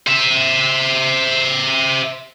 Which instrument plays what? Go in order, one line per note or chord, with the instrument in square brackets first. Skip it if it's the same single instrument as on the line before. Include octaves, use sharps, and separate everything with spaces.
[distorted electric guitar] C5 E5